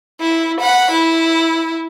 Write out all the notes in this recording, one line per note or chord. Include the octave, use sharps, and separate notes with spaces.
E4
F#5 B5
E4